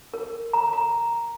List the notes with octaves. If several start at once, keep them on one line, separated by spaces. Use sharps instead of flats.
A#4
A#5
A#5